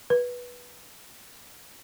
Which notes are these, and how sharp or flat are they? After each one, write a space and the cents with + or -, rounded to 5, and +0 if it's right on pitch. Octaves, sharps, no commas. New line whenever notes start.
B4 -15